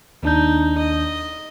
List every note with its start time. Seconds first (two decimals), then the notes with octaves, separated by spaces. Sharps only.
0.23 D#2 D4 D#4 G6
0.78 D#5